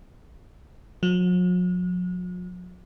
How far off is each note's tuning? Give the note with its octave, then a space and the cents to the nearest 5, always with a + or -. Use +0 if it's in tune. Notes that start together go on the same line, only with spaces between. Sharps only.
F#3 -45